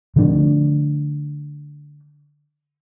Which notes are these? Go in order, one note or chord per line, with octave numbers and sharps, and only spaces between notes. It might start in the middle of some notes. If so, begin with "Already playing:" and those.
D3 F3 A3 D4